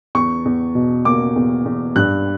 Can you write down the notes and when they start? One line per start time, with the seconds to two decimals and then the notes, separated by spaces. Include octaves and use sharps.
0.15 E2 C#6
0.45 E2
0.75 B2
1.05 A#3 D6
1.36 E2
1.66 E2
1.96 G2 F#6